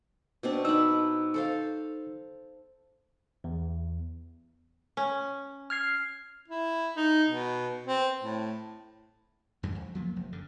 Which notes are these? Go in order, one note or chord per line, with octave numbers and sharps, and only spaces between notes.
B2 C4 D4
D#4 B5 E6
A4 C5 F5
E2
C#4
F6 G#6 C7
E4
D#4
B2
C4
A2
E2 G2 D3 G#3
F2
F3 F#3 A#3 B3
F1
F#2 D3